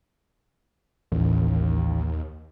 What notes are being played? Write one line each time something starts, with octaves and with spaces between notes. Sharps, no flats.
A1 D#2